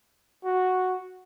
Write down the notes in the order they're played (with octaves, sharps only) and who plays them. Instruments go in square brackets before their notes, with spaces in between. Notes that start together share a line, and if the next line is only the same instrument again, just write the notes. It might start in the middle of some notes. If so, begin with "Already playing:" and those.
[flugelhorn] F#4